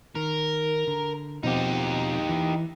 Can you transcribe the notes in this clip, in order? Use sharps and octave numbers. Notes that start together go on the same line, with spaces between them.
D#3 A#4
D3
B2 F3 C4 D#4 G4
E3